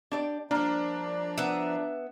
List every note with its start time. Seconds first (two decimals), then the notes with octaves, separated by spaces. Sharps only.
0.12 D4 G4 D5
0.51 F3 G3 A#3 D4 D5 A#5
1.38 B3 E5